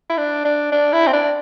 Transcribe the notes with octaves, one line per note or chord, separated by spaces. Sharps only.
E4
D4
D4
D4
E4
C4
D4